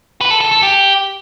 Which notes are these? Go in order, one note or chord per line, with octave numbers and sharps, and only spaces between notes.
B4
A4
A4
A4
G4